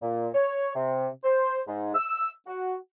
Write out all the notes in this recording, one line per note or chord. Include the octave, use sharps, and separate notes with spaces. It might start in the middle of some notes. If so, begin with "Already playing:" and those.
A#2
C#5
C3
C5
G#2
E6
F#4